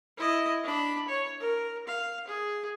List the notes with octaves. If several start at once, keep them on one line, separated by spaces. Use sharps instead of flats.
E4 D#5
D4 B5
C#5
A#4
F5
G#4